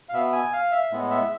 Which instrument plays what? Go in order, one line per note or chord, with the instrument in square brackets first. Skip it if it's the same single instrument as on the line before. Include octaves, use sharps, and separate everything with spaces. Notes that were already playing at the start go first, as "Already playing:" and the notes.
[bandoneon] F5
B2 B3 E5
G#5
F5
E5
A2 G#3 B3
E5